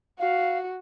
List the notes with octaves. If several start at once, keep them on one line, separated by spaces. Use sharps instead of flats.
F#4 F5